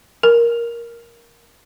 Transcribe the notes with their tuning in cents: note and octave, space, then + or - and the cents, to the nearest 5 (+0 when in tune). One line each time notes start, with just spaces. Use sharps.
A#4 +10